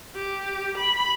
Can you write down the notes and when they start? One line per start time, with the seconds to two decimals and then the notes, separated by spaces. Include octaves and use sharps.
0.15 G4
0.78 B5